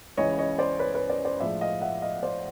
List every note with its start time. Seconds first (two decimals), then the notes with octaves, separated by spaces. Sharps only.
0.17 C#2 C#3 E3 C#5 D#5
0.39 C#5 D#5
0.58 C5 D5
0.79 B4 C#5
0.95 B4 C#5
1.10 C5 D5
1.25 C5 D5
1.40 A2 F3 G#3 D5 E5
1.61 D#5 F5
1.81 E5 F#5
2.02 D#5 F5
2.23 C5 D5